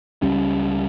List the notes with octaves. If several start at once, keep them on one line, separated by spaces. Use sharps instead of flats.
C#2 C#3 G3 C#4